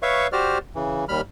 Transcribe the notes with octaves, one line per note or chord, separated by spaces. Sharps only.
B4 C#5 E5 F5 C#6
F#4 G4 C5 D5 F6
C#3 E3
D#2 G3 B5 F6